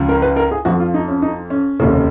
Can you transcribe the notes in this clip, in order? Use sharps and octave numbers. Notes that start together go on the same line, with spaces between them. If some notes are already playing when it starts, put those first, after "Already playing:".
Already playing: C#2 C#3 F3
A#4
B4
A#4
G#4
F2 F3 F#4
F4
D#4
C#4
D#4
C#4
F1 D#2 C#3